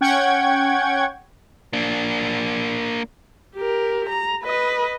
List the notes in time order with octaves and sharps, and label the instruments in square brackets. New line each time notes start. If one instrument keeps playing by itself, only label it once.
[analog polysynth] C#4 F#5 G5 C#6 G#6
[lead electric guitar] A#3 D4
[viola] G4 A#4
A#5
B4 D#5